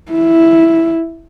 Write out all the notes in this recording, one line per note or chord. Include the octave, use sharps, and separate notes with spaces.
E4